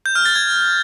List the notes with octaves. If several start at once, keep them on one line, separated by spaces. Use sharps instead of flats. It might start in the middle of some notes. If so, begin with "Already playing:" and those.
G6
F6
A6
G#6